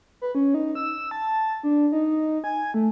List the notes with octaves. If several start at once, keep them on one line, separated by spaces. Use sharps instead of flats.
B4
C#4
D#4
E6
A5
D4
D#4
G#5
A3